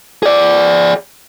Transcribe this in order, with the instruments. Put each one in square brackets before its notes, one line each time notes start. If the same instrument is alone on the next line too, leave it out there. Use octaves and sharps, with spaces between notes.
[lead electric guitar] G#4 D5